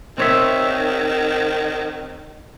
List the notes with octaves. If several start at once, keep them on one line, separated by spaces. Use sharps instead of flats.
D#3 C4 C#5 E5